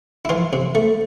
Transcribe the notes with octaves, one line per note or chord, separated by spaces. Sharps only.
E4
E3 F4
C3
A3